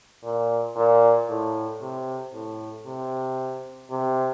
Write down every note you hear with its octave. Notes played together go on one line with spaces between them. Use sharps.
A#2
A#2
A2
C3
A2
C3
C3